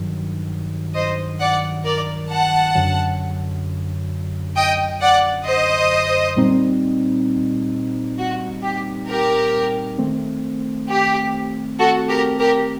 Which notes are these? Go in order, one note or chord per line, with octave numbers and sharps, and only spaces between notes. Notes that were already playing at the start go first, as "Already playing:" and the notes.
Already playing: G2 D#3 F#3
C5 D#5
D5 F#5
A#4 D5
F#5 A5
F#2 D3 F#3
D#5 G5
D5 F#5
C5 D#5
A#2 G3 C4 D#4
F#4
G4
G4 A#4
D#3 A3 C4
G4
F#4 A4
G4 A#4
G4 A#4